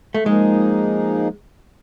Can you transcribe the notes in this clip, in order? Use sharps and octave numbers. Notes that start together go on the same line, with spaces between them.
A3
F3 G#3 A#3 D#4 G#4